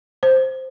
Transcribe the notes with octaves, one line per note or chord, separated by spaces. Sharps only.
C5